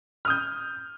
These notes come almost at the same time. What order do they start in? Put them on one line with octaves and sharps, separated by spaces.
F6 D#6 G6